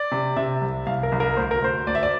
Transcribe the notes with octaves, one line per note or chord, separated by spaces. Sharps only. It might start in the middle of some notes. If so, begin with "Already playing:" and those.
Already playing: D5
C3
C3 E5
C2
C2 F5
A#4
C2
A#4
D2 C5
A#4
D2 C5
D2 D5
E5
D5